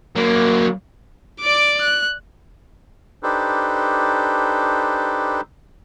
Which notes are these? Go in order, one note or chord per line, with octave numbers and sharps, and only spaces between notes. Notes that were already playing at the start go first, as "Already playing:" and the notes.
F#3 A#3
D5 D6
F#6
D4 D#4 G4 A4 B4 C5